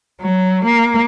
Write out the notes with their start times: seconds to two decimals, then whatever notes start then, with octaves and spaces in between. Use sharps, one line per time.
0.20 F#3
0.64 A#3